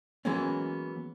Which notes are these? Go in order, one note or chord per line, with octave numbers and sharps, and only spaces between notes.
E3 F#3 G#3 A#3 B3 C#4